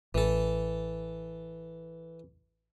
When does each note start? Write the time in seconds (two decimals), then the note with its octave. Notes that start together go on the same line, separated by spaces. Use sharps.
0.15 A1 E3 A4